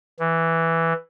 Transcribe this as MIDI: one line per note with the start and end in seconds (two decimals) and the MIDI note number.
0.20 0.93 52